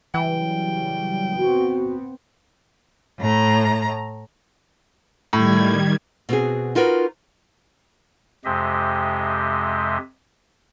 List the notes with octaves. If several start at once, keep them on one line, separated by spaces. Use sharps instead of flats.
C#3 E3 F#3 G3 G5
B3 C4 F#4
A2 A#5
A2 D#3 G3 G#6
B2 C4 F#4 G#4
D#4 F4 F#4 A#4 B4
F2 C3 G#3 G4 D#5 E5